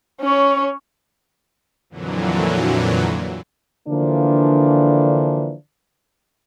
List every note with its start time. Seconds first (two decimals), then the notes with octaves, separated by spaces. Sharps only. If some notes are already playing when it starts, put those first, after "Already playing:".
0.21 C#4 C#5
1.90 F2 A#2 D3 E3 F#3
3.88 D3 E3 F3 A#3 D4